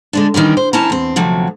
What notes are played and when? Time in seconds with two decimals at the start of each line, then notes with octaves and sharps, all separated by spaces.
0.13 D3 G#3 D4
0.34 D#3 E3 G3 C#4
0.57 C5
0.73 D#2 C4 C#4 E4 A5 A#5
0.90 E2 C4
1.16 D2 C3 F3 F#3